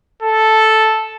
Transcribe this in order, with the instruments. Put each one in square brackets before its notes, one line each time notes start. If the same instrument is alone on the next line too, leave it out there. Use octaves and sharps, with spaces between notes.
[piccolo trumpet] A4